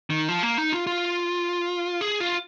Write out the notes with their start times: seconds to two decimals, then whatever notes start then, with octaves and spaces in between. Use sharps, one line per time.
0.10 D#3
0.29 F3
0.43 A#3
0.58 D#4
0.72 F4
0.87 F4
2.01 G#4
2.20 F4